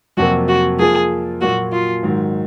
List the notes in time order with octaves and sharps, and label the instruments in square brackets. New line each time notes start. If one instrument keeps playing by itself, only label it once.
[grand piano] F2 C3 F#3 A#3 [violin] F#4
[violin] F#4
[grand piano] F3 A#3 F4 [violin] G#4
[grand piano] A#2 F#3 A#3 F4 [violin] F#4
[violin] F4
[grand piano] G#2 D#3 F#3